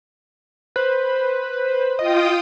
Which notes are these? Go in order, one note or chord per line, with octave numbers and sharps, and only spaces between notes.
B4 C5
F4 D#5 G5 D#6